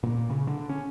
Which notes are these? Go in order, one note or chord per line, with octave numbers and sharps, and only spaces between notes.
A#2
C#3
D3
C#4